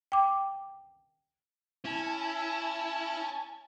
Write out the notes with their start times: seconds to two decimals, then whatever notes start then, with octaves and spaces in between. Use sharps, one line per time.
0.12 G5 D6
1.85 C#4 E4 G#5 A5